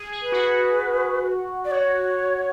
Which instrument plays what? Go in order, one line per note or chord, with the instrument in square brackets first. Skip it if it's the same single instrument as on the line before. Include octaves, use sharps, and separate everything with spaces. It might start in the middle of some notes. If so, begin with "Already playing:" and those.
Already playing: [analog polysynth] G#4
G#4
[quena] B4
[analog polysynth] F#4
[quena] D5
[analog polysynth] F#4 [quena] C#5